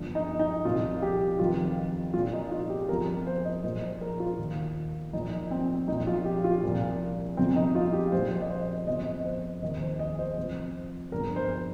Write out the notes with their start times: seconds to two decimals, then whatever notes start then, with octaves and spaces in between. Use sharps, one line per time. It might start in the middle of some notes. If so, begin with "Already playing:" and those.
Already playing: G1 G2 F3
0.15 D#4
0.39 D#4
0.65 C2 A#2 F3 F4
1.02 G4
1.39 F1 F2 D#3 F4
2.14 A#1 A#2 F3 F4
2.34 D#4
2.52 F4
2.70 G4
2.89 G1 F2 F3 A#4
3.27 C5
3.45 D#5
3.64 A#1 A#2 F3 C5
4.01 A#4
4.20 F4
4.39 D#2 D#3
5.13 A#1 A#2 F3 D#4
5.51 C4
5.88 A#1 A#2 F3 D#4
6.07 F4
6.25 G4
6.44 F4
6.63 C2 A#2 F3
7.37 G1 F2 C3 F3 C4
7.56 D#4
7.75 F4
7.93 G4
8.12 A#1 A#2 F3 C5
8.41 D#5
8.50 C5
8.87 G1 F2 F3 D#5
9.24 C5
9.62 F1 D#2 D#3 D#5
9.81 C5
9.99 D#5
10.19 C5
10.36 F1 F2 F3
11.12 G1 G2 F3 A#4
11.36 C5